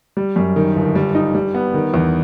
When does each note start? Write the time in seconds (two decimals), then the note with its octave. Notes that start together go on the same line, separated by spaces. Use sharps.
0.17 G3
0.36 F#2
0.56 D#3
0.76 G1
0.95 G3
1.15 D#4
1.35 G3
1.54 B3
1.74 D#3
1.94 E2